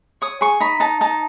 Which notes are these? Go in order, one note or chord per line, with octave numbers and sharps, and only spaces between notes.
C#5 D#6
G#4 C#6
D#4 B5
D#4 A5
D#4 A5